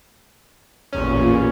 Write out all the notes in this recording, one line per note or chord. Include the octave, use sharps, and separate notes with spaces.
A1 E2 A#2 C#4